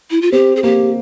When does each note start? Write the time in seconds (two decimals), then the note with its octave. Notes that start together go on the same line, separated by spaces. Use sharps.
0.11 E4
0.22 F4
0.32 C4 G4
0.56 G#4
0.63 A#3 G4